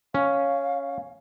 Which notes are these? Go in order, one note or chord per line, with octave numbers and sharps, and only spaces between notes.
C#4 F5